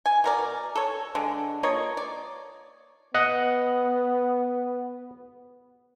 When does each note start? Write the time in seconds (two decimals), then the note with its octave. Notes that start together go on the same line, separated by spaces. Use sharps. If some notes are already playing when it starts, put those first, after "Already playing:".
0.06 G#5
0.24 B2 A#4 D5
0.76 A4 C#5
1.15 D3 G#3
1.63 A#3 F4 C#5 D#5
1.97 D5
3.14 B3 D#5 F#5